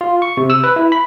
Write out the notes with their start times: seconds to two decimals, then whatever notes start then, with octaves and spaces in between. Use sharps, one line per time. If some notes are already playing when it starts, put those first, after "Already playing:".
0.01 F4
0.22 C#6
0.37 C3
0.50 E6
0.64 B4
0.76 E4
0.92 B5